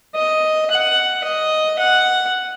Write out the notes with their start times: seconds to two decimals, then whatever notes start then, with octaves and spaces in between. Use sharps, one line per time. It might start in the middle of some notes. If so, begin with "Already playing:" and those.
0.15 D#5
0.71 F#5
1.24 D#5
1.79 F#5